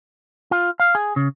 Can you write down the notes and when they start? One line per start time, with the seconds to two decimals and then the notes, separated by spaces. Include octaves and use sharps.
0.51 F4
0.80 F5
0.95 G#4
1.16 C#3